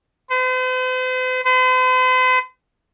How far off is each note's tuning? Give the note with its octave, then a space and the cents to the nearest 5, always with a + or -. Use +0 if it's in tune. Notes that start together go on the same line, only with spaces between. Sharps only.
C5 -45
C5 -45